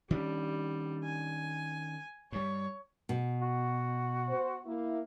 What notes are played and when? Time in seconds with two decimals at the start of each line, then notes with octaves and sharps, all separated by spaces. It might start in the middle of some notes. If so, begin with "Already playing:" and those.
0.11 D#3 G3 C#4 D4
1.04 G#5
2.32 G2 G3 C#5
3.09 B2
3.42 F#4
4.29 C5
4.66 A#3 E4